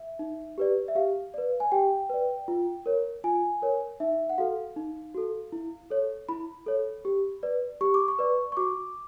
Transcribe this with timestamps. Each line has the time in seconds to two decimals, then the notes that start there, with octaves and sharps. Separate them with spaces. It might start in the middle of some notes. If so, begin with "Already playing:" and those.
Already playing: E5
0.19 D#4
0.58 G4 B4 D5
0.88 E5
0.95 G4 F5
1.34 B4 D5
1.60 G#5
1.72 G4 G5
2.10 B4 D5
2.48 F4
2.86 A#4 C#5
3.24 F4 G#5
3.62 A#4 C#5
4.00 D#4 E5
4.29 F#5
4.38 F#4 A4 F5
4.76 D#4
5.15 F#4 A4
5.52 E4
5.90 A4 C#5
6.29 E4 B5
6.66 A4 C#5
7.05 G4
7.43 B4 D5
7.81 G4 C#6
7.94 D6
8.08 C#6
8.19 B4 D5
8.52 C#6
8.57 F#4 D6